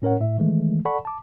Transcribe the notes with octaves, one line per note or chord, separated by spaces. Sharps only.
A2 C#4 A#4 C#5 F#5
A2 E5
D#3 E3 G#3 A3
A4 D5 F#5 A5 B5 C#6
A5 D6